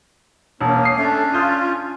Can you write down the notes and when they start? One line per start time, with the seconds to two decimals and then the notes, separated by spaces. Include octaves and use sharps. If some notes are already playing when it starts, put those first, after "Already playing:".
0.61 E1 A#3 C#4
0.83 D#6 C7
0.97 A3 C#4 D4
1.33 F4 D#6 G6